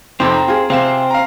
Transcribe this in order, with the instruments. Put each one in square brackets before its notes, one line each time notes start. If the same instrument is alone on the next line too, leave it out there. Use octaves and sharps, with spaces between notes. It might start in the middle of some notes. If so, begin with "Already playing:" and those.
[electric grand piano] F2 C3 C5 [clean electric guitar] C4 [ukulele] D#4
[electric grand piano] A#5
[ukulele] F4 G#4
[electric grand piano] C3 F5 E7 [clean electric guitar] C4
[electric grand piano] F5 A#5